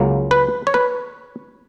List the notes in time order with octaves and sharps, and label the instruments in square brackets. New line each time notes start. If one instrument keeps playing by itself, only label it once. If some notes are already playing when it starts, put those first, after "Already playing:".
Already playing: [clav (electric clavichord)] C#2 C#3 F#3 A#3
B4
C#5
B4